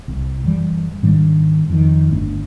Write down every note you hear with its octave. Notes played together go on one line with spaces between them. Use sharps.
C2
F#1 E3 G3
G#2 D#3 G3 D4
F2 D#3
G1 D3 A3 D4